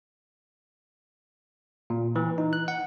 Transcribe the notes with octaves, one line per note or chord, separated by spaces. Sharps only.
A#2
E3
D#4
F#6
F#5